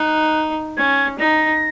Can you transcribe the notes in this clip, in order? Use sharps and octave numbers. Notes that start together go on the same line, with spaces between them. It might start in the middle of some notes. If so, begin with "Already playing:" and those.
Already playing: D#4 F#6
C#4 G#6
D#4 A#6